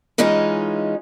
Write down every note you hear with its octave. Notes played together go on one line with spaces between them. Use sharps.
E3 G#3 C#4 D#4 F4